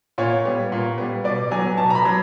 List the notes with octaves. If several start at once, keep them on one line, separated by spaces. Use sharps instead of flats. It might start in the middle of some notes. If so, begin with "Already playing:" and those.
A#2 C#5
G3 B3
A#2
G3 B3
B2 D5
F#3 B3 G#5
B2 A5
A#5
B5
F#3